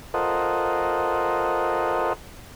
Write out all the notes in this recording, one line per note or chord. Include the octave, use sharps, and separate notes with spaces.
F4 A4 A#4 C5 D#5 F#5